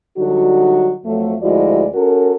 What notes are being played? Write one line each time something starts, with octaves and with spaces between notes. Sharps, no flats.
D3 F#3 G3 D#4 F#4
F2 F3 F#3 A3
D2 F3 G#3 E4 F#4 D5
C#4 F#4 A4 A#4